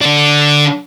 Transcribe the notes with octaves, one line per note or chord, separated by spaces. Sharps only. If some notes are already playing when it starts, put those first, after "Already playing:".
D3 D4